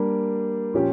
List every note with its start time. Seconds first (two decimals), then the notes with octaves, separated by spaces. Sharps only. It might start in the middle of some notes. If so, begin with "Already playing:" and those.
Already playing: G3 A#3 D4
0.74 A#2 F3 C#4 G4